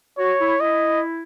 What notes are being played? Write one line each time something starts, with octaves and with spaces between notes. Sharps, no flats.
F#4 C#5
E4
E4 D#5